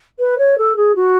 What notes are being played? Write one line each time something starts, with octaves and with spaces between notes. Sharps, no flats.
B4
C#5
A4
G#4
F#4